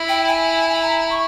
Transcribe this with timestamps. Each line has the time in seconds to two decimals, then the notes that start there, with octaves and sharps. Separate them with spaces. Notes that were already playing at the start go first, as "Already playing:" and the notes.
Already playing: E4
0.08 G5
0.28 G#5
0.74 G#5
0.82 A#5
1.10 C#6